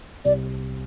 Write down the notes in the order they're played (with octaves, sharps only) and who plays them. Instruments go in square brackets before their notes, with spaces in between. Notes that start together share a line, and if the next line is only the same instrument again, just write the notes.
[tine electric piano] C2 C3 [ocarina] D5